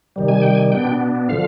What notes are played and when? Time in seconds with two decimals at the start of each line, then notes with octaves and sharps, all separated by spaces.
0.16 C3 D#3 G3
0.28 G#5
0.42 G5
0.55 G#5
0.72 B2 B3 D4 G5
1.29 D3 F3 F5